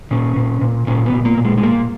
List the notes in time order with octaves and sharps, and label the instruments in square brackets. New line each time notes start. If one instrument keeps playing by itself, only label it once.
[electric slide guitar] A#2 C#4
A#2
A#2
A#2 C#4
B3
A#2
A#3
A#2
G#3
G#3
A#2 A#3